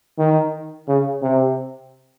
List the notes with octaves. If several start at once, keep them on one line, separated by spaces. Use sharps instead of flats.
D#3
C#3
C3